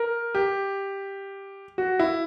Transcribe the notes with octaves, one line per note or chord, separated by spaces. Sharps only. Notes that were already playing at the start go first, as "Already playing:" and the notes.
Already playing: A#4
G4
F#4
E4